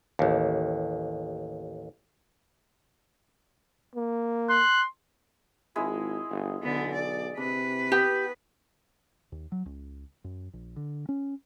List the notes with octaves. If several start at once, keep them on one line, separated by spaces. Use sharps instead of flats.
A1 D#2
A#3
C6 F#6
G#1 G#3 E4
G1
B1 D3 B3
D5
C3 D4 B4
B3 G4
D#2
F#3
C#2
F#2
A#1
D3
C#4